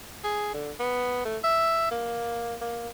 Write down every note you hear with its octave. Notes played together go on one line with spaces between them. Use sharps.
G#4
D3
B3
A3
E5
A#3
A#3